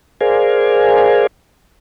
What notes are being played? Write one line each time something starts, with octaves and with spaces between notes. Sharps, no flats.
G#4 A#4 C5 D5 F5 G#5